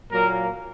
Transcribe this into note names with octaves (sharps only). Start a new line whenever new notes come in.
A#2 F#3 A#3 A#4